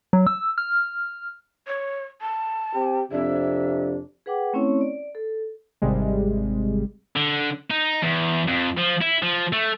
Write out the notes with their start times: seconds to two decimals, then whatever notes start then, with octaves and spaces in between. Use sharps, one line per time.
0.13 F#3
0.27 E6
0.58 F6
1.67 C#5
2.21 A5
2.74 C4 G4
3.12 F2 C3 D4 E5
4.26 G#4 B4 F#5 G5 D6
4.53 A3 C4 C#4 E4 C#5
4.81 D5
5.15 A4
5.82 G#1 C3 G3 G#3
7.16 D3
7.71 D#4
8.03 E2
8.48 F2
8.78 F3
9.02 E4
9.23 F3
9.53 A3